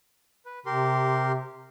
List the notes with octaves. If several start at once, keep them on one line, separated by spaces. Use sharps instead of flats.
B4
C3 G4 A#4 C6